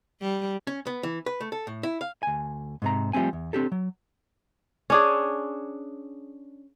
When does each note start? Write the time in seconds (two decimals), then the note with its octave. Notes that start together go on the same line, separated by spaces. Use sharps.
0.21 G3
0.67 C#4
0.87 B3
1.03 E3
1.26 B4
1.41 A3
1.52 A4
1.67 A2
1.83 E4
2.01 F5
2.23 D2 G#5
2.82 G#2 C3 A#5
3.13 F3 G3 A3 C4 G#5
3.33 E2
3.53 C4 D4 G4 A4
3.72 F#3
4.90 C#4 D4 G#4